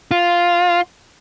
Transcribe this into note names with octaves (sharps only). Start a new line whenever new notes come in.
F4